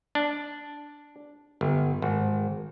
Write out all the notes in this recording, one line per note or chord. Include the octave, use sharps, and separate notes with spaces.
D4
G1
G#1